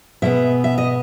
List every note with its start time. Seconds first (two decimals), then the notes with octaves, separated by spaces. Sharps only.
0.22 B2 G#3 B3 E5
0.64 E5
0.78 D#5